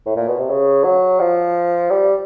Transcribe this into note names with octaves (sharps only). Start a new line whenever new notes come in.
A2
A#2
B2
C3
C#3
F#3
F3
G3